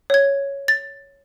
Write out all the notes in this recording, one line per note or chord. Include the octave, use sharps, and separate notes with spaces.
C#5 G#6
A6